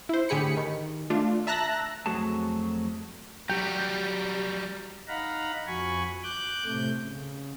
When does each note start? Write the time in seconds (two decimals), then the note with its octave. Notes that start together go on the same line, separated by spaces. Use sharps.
0.09 E4 C5
0.29 A2 D3 G4 G#4 B5 C#7
0.57 D#3
1.10 A3 D4 F4
1.47 E5 A5 A#5 E6 F#6 A#6
2.06 F2 F#3 A3 F#4 G#4 A5
3.50 F#3 G3 G4 G5
5.08 D#4 F5 F#5 A#5 B5
5.67 F2 F#4 G#5 B5 C#6
6.23 D6 F#6 G6
6.65 A2 C3 A3 G6
7.04 C#3